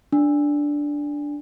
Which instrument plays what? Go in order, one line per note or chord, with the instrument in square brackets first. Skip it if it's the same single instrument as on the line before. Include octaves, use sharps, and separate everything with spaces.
[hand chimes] D4